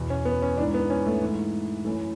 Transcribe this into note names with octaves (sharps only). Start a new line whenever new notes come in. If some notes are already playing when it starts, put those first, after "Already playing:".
Already playing: E2 B2
C#4
B3
C#4
G#2 E3 D4
B3
C#4
A3
G#2 E3
F#2 E3 A3